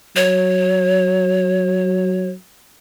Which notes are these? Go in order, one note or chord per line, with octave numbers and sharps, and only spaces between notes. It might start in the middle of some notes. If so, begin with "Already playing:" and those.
F#3 C#5